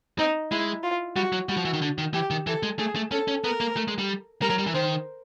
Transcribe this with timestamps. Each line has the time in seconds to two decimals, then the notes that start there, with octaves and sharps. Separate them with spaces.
0.18 C4 D#4
0.51 G#3 E4
0.83 F4
1.16 G3 F#4
1.32 F#3
1.49 G3 F#4
1.57 F3
1.65 E3
1.73 D#3
1.82 D3
1.98 D#3
2.14 E3 G4
2.30 D#3
2.47 E3 A4
2.63 G#3
2.79 A3 G#4
2.95 A3
3.12 C#4 A4
3.28 C#4
3.44 B3 A#4
3.60 A#3
3.77 A3
3.88 G#3
3.99 G3
4.42 G3 A#4
4.50 F#3
4.58 G3
4.67 E3
4.74 D#3 C5